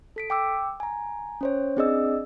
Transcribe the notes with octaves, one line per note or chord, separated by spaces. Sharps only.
A4 B6 D7
G5 D6 E6
G#5 A#5
C#4 C5 C#5
C4 D4 G#4 D5 D#5 E6